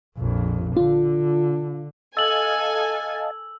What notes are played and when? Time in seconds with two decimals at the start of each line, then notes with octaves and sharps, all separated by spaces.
0.18 A#1 F2
0.77 D3 F4
2.17 A4 D#5 F5 G#5 A5 E6 F#7